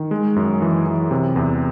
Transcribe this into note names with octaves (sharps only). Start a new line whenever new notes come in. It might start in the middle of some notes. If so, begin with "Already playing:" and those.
Already playing: D#3
G#3
F#2
E3
E3
C3
E2